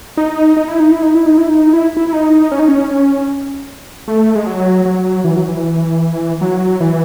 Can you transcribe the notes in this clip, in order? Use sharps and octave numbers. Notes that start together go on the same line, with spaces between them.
D#4
D#4
E4
D#4
E4
D#4
E4
D#4
E4
D#4
E4
E4
D#4
C#4
D#4
C#4
C#4
A3
G#3
F#3
F#3
E3
F#3
E3
F#3
E3